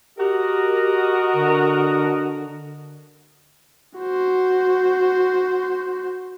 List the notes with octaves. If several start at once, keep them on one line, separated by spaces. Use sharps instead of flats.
F#4 G4 A#4 D#5
D3
F#4 C5